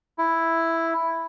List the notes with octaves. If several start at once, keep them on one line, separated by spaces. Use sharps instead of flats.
E4